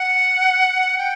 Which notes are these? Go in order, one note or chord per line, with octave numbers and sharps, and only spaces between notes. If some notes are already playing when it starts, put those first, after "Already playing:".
Already playing: F#5
G5